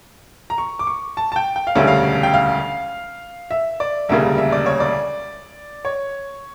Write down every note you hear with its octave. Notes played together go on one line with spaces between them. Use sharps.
A#5
C#6
D6
C#6
A5
A5
G5
G5
F5
E1 D2 C#3 G3 C#4 E5
F5
G5
F5
E5
D5
E1 D2 C#3 G3 A#3 E5
E5
D5
C#5
D5
C#5